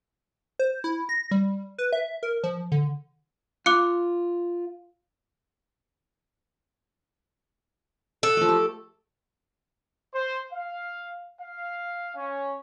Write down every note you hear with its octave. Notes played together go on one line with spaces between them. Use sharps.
C5
E4
A#6
G3
B4
E5
A#4
F3
D3
F4 D6 F#6 C#7
A4 F#5
F3 A3
G4
C5
F5
F5
C#4